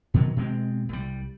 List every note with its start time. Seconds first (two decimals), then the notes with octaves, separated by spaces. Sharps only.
0.14 B2 D#3 E3 F#3
0.36 B2 G#3 C4
0.89 C2 G3